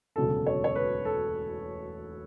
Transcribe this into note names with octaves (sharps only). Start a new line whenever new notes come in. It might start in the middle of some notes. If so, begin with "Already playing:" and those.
E1 D2 C#3 F#3 A3 A4
C#5
C#5
B4
A4